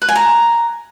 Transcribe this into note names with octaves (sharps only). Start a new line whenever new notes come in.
B4
G#5
A#5